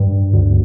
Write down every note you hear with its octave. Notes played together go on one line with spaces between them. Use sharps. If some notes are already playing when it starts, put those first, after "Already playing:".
Already playing: G2
D2